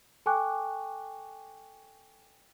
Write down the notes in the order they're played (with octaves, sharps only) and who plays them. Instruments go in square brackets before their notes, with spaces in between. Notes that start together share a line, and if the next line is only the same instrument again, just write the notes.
[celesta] A4 G5 G#5 C#6 D6 F#6